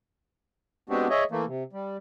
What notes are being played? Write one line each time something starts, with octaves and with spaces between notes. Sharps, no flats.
G#3 B3 C4 D4 F#4 G4
G#4 C#5 D#5 E5
E3 A3 A#3
C3
G3